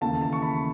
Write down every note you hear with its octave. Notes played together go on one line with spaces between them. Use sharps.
D#2 C#3 E3 A3 A5
A5
C#6
B5